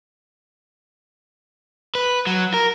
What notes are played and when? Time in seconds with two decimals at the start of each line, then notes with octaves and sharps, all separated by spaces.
1.95 B4
2.27 F#3
2.54 A#4